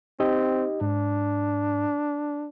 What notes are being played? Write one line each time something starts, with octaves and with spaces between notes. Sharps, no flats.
C4 D#4 G4 D#5
G#2 D4